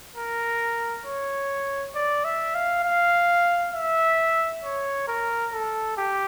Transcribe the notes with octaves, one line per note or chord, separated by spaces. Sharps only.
A#4
C#5
D5
E5
F5
F5
E5
C#5
A#4
A4
G4